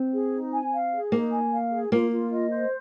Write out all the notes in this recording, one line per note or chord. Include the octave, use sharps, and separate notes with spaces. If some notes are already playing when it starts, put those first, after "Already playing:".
Already playing: C4
G#4
D#4
G#5
F5
G#4
A#3 D#4
G#5
F5
G#4
A#3 F4
F4
D#5
C5